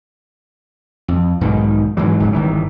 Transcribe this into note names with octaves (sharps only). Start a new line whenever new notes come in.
F2
B1 G#2 B2 D#3
G#2 E3 F#3
D1 G#2 C#3 F#3
G1 D#3 E3